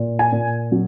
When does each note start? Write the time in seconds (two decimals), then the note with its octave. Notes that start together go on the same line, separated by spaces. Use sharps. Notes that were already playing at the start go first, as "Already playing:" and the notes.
Already playing: A#2
0.19 G#5
0.32 A#2
0.72 F#3